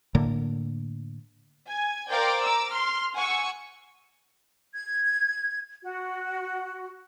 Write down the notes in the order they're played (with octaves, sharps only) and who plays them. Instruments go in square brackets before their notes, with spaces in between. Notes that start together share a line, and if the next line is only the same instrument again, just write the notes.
[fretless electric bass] A2 D3 A#3
[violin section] G#5 G#6
A#4 C5 D5 F5 G5 D6
A#5 D6 E6
C6 F6
F#5 G#5 C#6 E6
[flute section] G#6
F#4